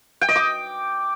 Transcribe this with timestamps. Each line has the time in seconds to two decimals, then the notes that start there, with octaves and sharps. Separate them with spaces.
0.21 G5
0.29 D#5
0.36 D6